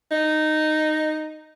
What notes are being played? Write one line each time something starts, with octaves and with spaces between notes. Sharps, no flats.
D#4